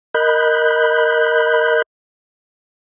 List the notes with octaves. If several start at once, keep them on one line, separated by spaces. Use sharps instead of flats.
A#4 D#5 B5 F#6 G6